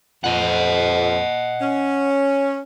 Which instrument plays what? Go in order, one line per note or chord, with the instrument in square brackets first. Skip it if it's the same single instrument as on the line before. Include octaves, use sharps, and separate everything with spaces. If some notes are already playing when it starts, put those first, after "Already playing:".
[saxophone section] F2 [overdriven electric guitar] D#5 F#5
[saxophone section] C#4